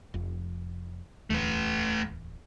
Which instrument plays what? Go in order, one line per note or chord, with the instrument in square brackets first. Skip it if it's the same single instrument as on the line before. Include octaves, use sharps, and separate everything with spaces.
[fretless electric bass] F1 F2
[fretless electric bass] D1 E2 [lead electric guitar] A3 B4